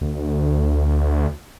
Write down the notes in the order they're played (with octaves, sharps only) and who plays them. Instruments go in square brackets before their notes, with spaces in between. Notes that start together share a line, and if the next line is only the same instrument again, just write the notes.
[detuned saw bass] D2